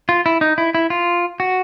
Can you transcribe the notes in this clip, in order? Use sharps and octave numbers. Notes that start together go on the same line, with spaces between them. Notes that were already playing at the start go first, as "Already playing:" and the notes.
F4
E4
D#4
E4
E4
F4
F#4